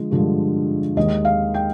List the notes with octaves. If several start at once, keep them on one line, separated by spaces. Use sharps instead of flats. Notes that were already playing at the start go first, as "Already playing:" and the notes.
Already playing: D3 F3 G#3
G2 D3 F3 G#3
D#2 D#3 G#3 D#5
F5
G5